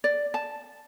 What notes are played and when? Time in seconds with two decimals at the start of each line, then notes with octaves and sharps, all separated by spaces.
0.04 D5
0.34 A5